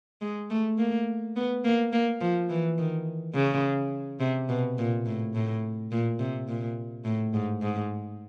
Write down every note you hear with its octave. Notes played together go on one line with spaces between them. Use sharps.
G#3
A3
A#3
B3
A#3
A#3
F3
E3
D#3
C#3
C3
B2
A#2
A2
A2
A#2
C3
A#2
A2
G#2
G#2